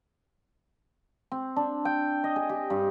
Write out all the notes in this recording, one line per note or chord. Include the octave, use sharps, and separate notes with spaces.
C4
D4
G5
D#5
G#4
G4
G2